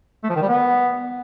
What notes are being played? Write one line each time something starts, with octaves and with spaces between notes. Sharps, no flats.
A3
F3
D#3
G3
B3